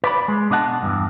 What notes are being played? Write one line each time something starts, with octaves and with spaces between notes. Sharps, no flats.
B4 D5 B5
G#3
B2 D4 D#5 F#5 A5
E2 G2